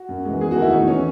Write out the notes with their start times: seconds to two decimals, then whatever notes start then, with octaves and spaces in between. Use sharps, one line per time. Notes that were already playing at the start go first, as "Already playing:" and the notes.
Already playing: F#4
0.09 F#2
0.25 E3 G#3
0.40 E2 G#4
0.51 F#4
0.56 D#3 A3
0.62 E4
0.71 A2 D#4
0.87 E3 A3 C#4